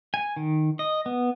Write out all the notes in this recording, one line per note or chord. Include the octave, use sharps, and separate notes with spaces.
G#5
D#3
D#5
B3